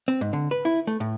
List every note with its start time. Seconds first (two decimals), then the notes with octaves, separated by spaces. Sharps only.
0.08 C4
0.21 G#2
0.33 D3
0.51 B4
0.65 E4
0.87 A3
1.00 A2